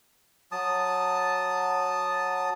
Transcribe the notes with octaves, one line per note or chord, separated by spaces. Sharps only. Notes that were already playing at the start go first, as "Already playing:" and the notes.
F#3 A5 D#6